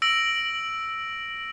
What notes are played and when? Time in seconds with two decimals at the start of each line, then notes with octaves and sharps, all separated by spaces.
0.02 E6 A#6 D7 F#7